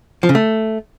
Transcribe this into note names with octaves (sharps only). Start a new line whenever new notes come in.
F3
C#3
A3